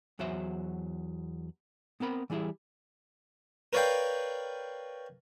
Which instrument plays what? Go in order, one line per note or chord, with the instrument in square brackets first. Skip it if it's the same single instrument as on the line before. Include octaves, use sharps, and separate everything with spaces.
[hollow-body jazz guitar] E2 F#3 F#4 C5 E5
B3 C4 A#4 B5
E3 G3 E4 G#4 E5
[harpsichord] A#4 B4 C#5 D5 F5 G5